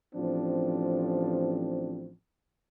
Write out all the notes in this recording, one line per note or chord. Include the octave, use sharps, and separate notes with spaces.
A1 F3 C4 D4